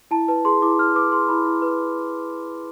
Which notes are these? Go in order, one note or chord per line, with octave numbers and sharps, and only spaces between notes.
E4 A5
B4 A5
G#4 C6
E4 D6
E4 F6
B4 D6
G#4 C6
E4 B5
E4
B4